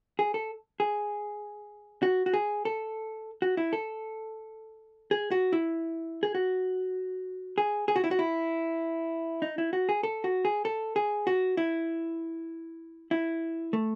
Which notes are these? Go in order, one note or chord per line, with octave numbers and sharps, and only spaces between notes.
G#4
A4
G#4
F#4
F#4
G#4
A4
F#4
E4
A4
G#4
F#4
E4
G#4
F#4
G#4
G#4
F#4
E4
F#4
E4
D#4
E4
F#4
G#4
A4
F#4
G#4
A4
G#4
F#4
E4
E4
A3